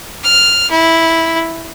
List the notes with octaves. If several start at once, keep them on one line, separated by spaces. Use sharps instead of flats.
F6
E4